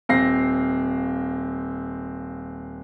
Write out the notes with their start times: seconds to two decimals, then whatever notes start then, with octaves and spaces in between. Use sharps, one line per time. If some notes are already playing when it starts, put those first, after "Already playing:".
0.09 D#1 C4 F5 A#6 C7